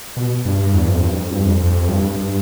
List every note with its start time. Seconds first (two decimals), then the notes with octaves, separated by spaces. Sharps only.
0.17 B2
0.46 G2
0.74 E2
0.89 F2
1.00 G2
1.13 F2
1.31 G2
1.45 F2
1.60 F2
1.89 G2
2.02 G2
2.16 G2